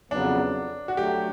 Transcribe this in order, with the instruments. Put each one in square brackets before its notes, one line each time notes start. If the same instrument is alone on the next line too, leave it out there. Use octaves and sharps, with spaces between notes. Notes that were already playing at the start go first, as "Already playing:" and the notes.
[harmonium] F2 C#3 F#3 B3 [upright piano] D4
[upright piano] F#4
[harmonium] D3 F#3 A3 [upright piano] G4